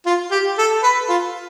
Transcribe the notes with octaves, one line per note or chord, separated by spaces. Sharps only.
F4
G4
A4
B4
F4